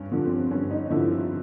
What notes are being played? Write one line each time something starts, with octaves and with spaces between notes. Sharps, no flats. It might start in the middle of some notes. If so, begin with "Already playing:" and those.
Already playing: G2 C#4
D3 F3
C4
G2 C#4
D#4
D3 F3 E4
F4